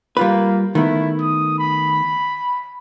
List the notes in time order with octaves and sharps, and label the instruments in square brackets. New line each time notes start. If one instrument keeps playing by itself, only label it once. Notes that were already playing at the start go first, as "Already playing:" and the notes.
[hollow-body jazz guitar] G3 F4 B4 [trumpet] A#3
[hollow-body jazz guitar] D#3 A3 B3 [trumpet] E4
[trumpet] D#6
B5